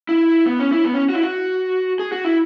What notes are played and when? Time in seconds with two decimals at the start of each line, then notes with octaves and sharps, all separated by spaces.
0.09 E4
0.47 B3
0.59 C#4
0.72 E4
0.85 B3
0.94 C#4
1.09 F#4
1.14 E4
1.23 F#4
1.99 G#4
2.12 F#4
2.25 E4